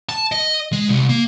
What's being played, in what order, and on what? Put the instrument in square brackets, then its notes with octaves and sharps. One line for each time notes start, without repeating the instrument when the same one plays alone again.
[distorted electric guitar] A5
D#5
G#3
C2
A#3